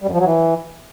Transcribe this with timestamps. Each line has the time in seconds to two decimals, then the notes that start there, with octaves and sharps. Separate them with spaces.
0.02 G3
0.07 F#2
0.13 F3
0.19 F#3
0.25 E3